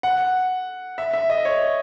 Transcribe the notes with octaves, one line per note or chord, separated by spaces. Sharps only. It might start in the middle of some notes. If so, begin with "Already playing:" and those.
F#5
E5
E5
D#5
C#5